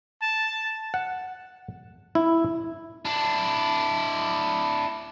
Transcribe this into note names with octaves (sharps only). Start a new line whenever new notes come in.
A5
F#5
E4
D4 E4